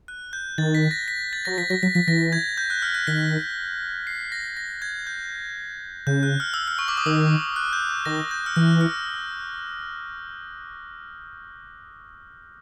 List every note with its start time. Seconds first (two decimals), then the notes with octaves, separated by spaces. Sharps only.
0.08 F#6
0.33 G6
0.58 D#3 A6
0.74 B6
0.91 A#6
1.08 B6
1.33 A6
1.45 F#3 A#6
1.58 F3 B6
1.70 F#3 A#6
1.83 F#3 B6
1.95 F3 B6
2.07 E3 A#6
2.32 G#6
2.58 G6
2.70 F#6
2.82 F6
2.95 F#6
3.07 D#3 B6
4.07 C7
4.32 A#6
4.57 A#6
4.82 G#6
5.07 G6
6.07 C#3 G6
6.23 F#6
6.40 F6
6.54 E6
6.68 F6
6.79 C#6
6.88 D6
6.97 D#6
7.06 D#3 E6
7.56 F#6
7.73 G6
8.05 D#3 A#6
8.31 G6
8.46 F6
8.56 E3 F#6
8.81 F6